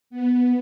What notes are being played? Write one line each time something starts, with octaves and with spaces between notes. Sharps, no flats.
B3